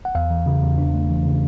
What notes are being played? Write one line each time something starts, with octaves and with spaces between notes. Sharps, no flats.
F#5
E2 F5
E3
C#3
E2
D4
A3
E3
C#3